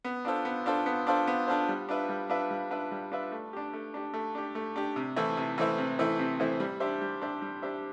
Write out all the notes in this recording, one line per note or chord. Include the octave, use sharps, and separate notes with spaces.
B3
D4 F4 A4 C5
B3
D4 F4 A4 C5
B3
D4 F4 A4 C5
B3
D4 F4 A4 C5
G3
D4 F4 B4 E5
G3
D4 F4 B4 E5
G3
D4 F4 B4 E5
G3
D4 F4 B4 E5
A3
D4 G4
A3
D4 G4
A3
D4 G4
A3
D4 G4
C3
E3 A3 C4 E4
C3
E3 A3 C4 E4
C3
E3 A3 C4 E4
C3
E3 A3 C4 E4
G3
D4 G4 C5 E5
G3
D4 G4 C5 E5
G3
D4 G4 C5 E5